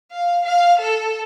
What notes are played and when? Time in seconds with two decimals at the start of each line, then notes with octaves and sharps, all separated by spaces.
0.11 F5
0.45 F5
0.79 A4